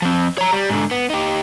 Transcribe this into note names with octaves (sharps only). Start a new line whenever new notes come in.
F3 C4
C#5 A#5
G3
G#2 D3
B3
D#4 G4